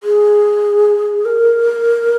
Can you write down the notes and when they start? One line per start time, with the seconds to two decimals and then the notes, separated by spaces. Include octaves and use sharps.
0.04 G#4
1.25 A#4